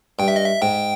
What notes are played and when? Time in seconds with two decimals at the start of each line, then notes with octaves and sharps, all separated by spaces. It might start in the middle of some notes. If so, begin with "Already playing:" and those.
0.19 G2 G5
0.28 E5
0.36 D#5
0.45 E5
0.62 G#2 G5